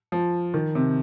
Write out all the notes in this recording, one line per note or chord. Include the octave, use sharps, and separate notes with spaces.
F3
D#3
C3